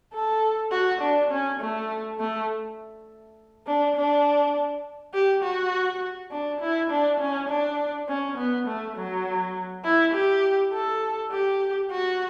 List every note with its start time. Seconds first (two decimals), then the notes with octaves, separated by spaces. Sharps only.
0.13 A4
0.72 F#4
1.01 D4
1.31 C#4
1.60 A3
2.20 A3
3.67 D4
3.96 D4
5.14 G4
5.43 F#4
6.31 D4
6.61 E4
6.90 D4
7.20 C#4
7.49 D4
8.08 C#4
8.38 B3
8.67 A3
8.97 F#3
9.85 E4
10.14 G4
10.73 A4
11.32 G4
11.91 F#4